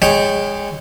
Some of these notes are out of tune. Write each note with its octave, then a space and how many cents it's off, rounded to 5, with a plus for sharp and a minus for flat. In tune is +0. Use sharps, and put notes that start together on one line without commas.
G#3 -20 C#5 -5 G5 +0